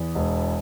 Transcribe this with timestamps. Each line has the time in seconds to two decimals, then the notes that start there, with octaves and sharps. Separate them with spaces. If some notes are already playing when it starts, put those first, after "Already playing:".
Already playing: E2
0.15 E1